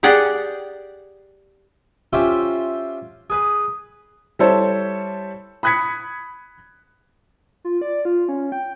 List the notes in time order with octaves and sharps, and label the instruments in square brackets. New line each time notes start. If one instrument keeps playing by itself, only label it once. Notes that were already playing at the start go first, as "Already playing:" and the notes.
[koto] G4 G#4 D5 F#5 G5
[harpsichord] C#4 F4 G4 C5 E5
G#4 B4
[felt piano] G3 E4 A4 C5 C#5
B5 D#6 F#6 G#6 B6 C#7
[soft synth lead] F4
D5
F4
C#4
G5